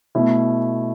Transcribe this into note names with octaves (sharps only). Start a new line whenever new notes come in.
B2 A3 E4